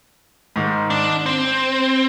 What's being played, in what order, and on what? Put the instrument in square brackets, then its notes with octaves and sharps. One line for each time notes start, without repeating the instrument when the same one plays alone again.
[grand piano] G#2 D#3 G#3
[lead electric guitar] D4
C4